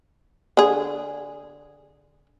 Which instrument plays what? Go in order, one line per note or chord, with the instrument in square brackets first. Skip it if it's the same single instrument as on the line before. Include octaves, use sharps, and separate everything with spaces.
[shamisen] D3 G#4